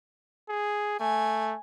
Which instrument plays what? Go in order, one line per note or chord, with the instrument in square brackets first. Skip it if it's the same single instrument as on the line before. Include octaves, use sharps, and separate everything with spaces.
[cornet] G#4
[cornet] A3 [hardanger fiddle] G#5